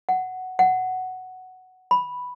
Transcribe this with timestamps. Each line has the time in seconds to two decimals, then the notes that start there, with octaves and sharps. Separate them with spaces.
0.09 F#5
0.59 F#5
1.91 B5